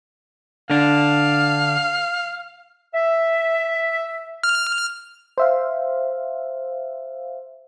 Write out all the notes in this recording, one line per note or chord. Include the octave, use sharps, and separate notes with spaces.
D3 D4 F5
E5
F6
C5 E5 F5